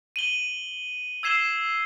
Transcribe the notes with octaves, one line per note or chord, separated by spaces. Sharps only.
D#7 F#7 G7
E6 G#6 C7 E7 G7